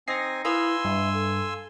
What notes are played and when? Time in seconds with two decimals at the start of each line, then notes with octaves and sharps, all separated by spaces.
0.08 C4 D#4 G#5 A#6 C7
0.45 E4 B4 F5 G#5 C6 D#6 E6
0.85 G2 E5
1.13 A4